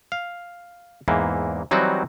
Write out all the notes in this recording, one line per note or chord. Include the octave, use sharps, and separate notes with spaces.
F5
E2 G#2 E3 A#3
E3 F#3 G3 C4 D#4 F#4